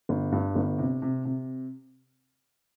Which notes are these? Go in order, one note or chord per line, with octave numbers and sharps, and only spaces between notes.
G1
G2
G1
C3
C3
C3